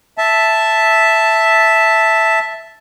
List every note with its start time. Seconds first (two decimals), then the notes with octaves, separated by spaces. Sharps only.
0.18 E5 A5